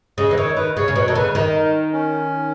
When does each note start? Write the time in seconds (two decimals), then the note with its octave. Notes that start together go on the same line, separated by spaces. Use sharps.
0.18 C#3 D#5
0.31 E3
0.37 D#3 C#5
0.56 D#3 B4
0.77 C#3 C#5
0.88 C#3
0.96 B2 C#5
1.08 D#3 A4
1.15 C#3 B4
1.35 D#3
1.93 C#4